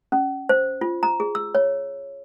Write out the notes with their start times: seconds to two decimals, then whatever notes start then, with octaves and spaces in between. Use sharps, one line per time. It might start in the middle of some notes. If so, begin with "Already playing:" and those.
0.12 C#4
0.49 C5
0.81 F4
1.03 A#5
1.20 G#4
1.35 E6
1.55 C#5